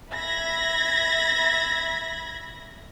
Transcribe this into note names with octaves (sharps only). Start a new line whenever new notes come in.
E5 B5 G#6 A#6